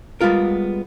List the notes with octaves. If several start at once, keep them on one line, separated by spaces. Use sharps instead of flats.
G3 G#3 B3 F4 A#4